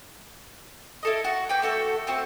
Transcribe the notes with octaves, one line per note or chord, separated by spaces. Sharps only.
E4 A4 D#5
F#4
B4 G5 D6
A3 F#4 A4
A3 C4 F#4